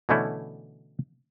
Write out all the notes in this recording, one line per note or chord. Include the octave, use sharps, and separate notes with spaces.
B2 D3 E3 A3 C#4 E4